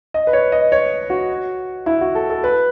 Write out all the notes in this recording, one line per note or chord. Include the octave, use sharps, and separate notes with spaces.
D#5
B4
C#5
D#5
C#5
F#4
E4
F#4
A4
A4
B4